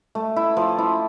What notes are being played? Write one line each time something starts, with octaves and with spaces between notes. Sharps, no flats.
A3
E4
F3
E4